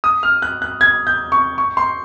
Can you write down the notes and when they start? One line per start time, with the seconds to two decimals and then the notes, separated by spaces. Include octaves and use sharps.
0.04 D#6
0.23 F6
0.42 F#6
0.62 F#6
0.81 G#6
1.07 G6
1.32 C#6
1.58 C#6
1.77 C6